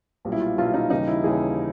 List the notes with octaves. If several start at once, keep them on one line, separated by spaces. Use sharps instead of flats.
B1 A#2 G3
E4
F4
B1 A#2 G3 F4
D#4
D#2 C#3 E3 G3 D#4
E4
D#2 C#3 E3 G3 G#4